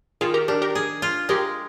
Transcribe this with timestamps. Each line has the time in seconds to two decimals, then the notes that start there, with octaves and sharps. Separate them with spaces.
0.21 D#3 F4 G#4
0.34 G4 A#4
0.48 D4 G4 A#4
0.62 G4 A#4
0.75 G#4
1.02 F4
1.29 G#3 G4 A#4